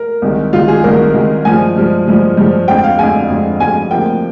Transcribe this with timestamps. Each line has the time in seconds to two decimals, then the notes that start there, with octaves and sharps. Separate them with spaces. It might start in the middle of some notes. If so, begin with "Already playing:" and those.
Already playing: A#4
0.22 C2 C3 D#3 G#3
0.53 C2 C3 D#3 G#3 F4
0.68 G#4
0.84 C2 C3 D#3 G#3 A#4
1.14 C2 C3 D#3 G#3
1.45 G2 F3 G#3 G#5
1.76 G2 F3 G#3
2.06 G2 F3 G#3
2.37 G2 F3 G#3
2.68 F2 D3 G#3 G5
2.84 F5
2.98 F2 D3 G#3 G#5
3.30 F2 D3 G#3
3.60 F2 D3 G#3 G#5
3.91 D2 C3 F3 A#3 G5